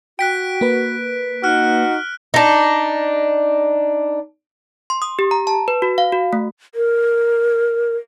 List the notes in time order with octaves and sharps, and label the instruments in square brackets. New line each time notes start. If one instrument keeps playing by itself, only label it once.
[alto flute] F#4 [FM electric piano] G5 [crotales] F#6 B6 D7
[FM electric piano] A#3 B4
[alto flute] D#4 [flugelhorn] F#4 [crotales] F6 F#6
[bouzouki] D4 D#4
[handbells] C6
D#6
G4
A#5
A5
B4
F#4
F5
F#4
A3
[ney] A#4